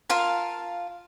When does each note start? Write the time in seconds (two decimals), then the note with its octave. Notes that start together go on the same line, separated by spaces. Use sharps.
0.09 F4 A#4 F5 A5